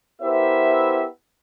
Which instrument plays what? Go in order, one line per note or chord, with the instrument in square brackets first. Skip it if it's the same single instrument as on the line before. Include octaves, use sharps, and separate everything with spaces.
[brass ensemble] B3 E4 G4 A#4 C5 E5